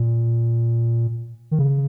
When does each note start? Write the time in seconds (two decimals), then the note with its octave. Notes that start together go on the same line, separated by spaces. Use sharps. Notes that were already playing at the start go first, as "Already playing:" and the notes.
Already playing: A#2
1.51 D#3
1.59 C#3